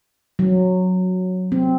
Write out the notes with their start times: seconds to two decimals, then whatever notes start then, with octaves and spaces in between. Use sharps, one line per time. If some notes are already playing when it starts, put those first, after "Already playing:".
0.39 F#3
1.52 C4